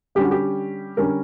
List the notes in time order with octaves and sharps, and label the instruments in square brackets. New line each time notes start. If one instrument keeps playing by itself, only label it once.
[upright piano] D3 G3 C#4 G4
F#4
G4
D3 G3 C#4 A#4